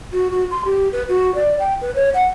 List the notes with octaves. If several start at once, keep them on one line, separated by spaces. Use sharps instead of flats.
F#4
F#4
C6
G4
B4
F#4
D5
G5
B4
C#5
F#5